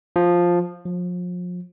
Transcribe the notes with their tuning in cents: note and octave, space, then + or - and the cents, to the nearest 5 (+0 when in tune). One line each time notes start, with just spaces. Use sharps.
F3 +5
F3 +35